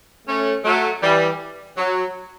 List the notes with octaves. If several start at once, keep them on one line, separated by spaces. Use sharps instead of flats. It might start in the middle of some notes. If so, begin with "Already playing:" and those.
A3 C#4
F#3 A3
E3 G3
F#3